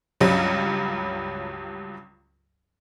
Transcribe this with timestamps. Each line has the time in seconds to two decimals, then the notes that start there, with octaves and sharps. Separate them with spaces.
0.21 C#2 G2 F#3 G3